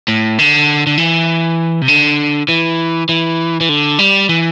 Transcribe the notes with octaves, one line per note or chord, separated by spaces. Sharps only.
A2
D3
D3
E3
C3
D3
E3
E3
E3
D3
G3
E3